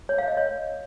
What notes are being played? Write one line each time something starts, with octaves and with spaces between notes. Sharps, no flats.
C#5
F5
D#5
C#5